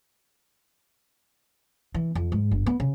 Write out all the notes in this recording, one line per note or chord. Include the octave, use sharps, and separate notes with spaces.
E3
F2
G#2
G1
B3
C#3